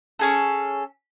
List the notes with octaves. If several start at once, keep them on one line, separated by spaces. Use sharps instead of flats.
C#4 G#4 A4